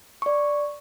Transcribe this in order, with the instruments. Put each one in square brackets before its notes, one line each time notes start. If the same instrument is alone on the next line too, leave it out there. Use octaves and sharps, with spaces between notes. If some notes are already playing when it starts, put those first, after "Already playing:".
[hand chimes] D5 C#6